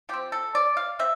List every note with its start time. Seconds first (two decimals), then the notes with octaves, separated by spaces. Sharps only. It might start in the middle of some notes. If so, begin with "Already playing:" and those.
0.09 F3 C4 G4
0.32 A4
0.55 D5
0.77 F5
0.99 C4 E5